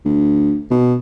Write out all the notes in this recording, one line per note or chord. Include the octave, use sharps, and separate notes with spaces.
D2
B2